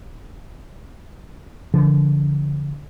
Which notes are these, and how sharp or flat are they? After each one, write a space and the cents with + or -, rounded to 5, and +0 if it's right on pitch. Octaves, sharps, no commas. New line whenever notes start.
D3 -40 F3 -40